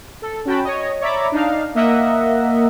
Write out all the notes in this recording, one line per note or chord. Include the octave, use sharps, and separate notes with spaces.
A4
C#4 F#4 G5 A5 B5
C#5 D#5
C#5 D5 E5 A#5 B5 D6
D4 D#4 F5
A#3 A#4 D#5 E5 F#5